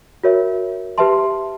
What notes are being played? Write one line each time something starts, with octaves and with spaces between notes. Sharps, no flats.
F#4 A#4 C#5 E5
G4 B4 E5 A5 C6